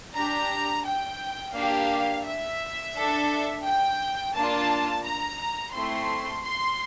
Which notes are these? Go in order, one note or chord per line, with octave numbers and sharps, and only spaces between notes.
D4 G4 A#5
G5
A#3 D4 G4 F5
E5
D4 A4
G5
A#3 D4 F4 A5
A#5
A3 C4 E4 C6
C6